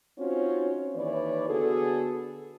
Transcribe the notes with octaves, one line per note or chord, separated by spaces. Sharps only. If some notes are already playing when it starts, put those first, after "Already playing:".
C4 C#4 D#4 F4 F#4 C#5
D#2 E3 B4 C#5 D5
D3 B3 F#4 G#4 A4